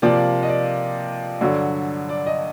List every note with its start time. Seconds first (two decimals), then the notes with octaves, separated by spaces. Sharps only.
0.02 C3 F3 A#3 D5
0.43 D#5
0.49 D5
1.41 G2 D3 F#3
2.09 D5
2.26 D#5